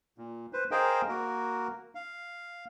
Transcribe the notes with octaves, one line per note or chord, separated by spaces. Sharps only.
A#2
B4 C5
G#4 A#4 C5 D#5 F5 G5
A#3 F#4 A#4
F5